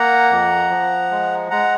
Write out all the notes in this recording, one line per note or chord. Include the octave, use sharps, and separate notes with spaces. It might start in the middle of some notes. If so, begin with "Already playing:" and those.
Already playing: A#3 F#5 A#5
F2
F3
G#3
G#3 F#5 A#5